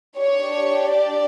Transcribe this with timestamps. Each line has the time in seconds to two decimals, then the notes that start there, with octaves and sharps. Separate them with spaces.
0.18 D4 G4 C#5
0.91 D5